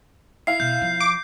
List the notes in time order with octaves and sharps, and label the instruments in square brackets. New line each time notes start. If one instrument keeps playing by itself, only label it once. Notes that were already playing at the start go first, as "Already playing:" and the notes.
[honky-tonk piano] E4 F5 [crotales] C7
[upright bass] B2 [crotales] G6
[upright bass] F3
[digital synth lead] D6